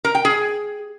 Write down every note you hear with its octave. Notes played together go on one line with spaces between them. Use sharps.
A#4
G5
G#4